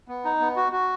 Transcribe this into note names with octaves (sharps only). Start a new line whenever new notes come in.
B3
D#4
B3
F#4
F#4